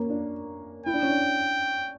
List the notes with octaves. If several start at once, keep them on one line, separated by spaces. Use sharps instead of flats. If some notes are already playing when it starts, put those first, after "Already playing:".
Already playing: A#3 C#4
D4
E4 G5
D4
C#4
D4